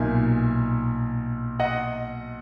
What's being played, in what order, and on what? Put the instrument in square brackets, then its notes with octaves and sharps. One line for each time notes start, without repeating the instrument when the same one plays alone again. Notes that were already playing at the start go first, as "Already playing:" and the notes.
Already playing: [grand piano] B1 A#2 A#3 D#4 E5 G#5
D#5 F#5